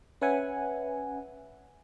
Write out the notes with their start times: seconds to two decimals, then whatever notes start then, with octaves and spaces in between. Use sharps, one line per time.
0.21 C#4 B4 E5 F#5 G#5